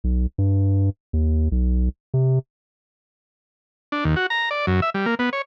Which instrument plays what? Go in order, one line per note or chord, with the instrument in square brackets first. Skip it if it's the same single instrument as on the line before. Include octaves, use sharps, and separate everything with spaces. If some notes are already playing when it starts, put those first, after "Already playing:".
[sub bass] B1
G2
D#2
B1
C3
[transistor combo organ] D4
D#2
F#4
A#5
D5
F#2
E5
G3
A#3
B3
C#5